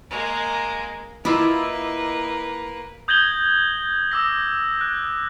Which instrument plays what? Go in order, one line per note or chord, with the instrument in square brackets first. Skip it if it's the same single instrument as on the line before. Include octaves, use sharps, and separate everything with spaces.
[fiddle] G#3 A#3
[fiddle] A#3 B4 [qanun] E4 F4 [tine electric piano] D#5 D6 E6
[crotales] D#6 G6 G#6 A#6 F#7 G7
D6 E6 A#6
F#6